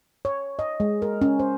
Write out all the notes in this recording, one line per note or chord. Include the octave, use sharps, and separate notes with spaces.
C#5
D#5
G#3
A#4
C#4
C5